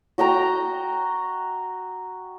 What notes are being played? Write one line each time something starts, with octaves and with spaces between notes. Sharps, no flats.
F#4 D#5 G5 A#5